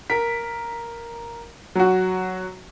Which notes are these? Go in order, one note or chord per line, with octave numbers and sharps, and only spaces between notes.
A#4 B6
F#3 F#4